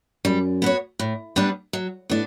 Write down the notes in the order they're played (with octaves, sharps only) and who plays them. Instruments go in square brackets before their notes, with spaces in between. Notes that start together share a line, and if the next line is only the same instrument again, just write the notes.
[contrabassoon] F#2 [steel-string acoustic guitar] G3
[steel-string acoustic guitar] B3 F#4 C#5
A2
G3 B3 D4
F#3
[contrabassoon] A2 [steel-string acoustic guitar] B3 D4